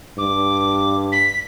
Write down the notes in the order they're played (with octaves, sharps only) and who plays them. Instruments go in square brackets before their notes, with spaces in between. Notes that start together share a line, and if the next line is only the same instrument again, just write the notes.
[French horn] G2 [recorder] D6
[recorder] B6